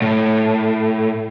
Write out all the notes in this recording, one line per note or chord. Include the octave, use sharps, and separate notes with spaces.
A2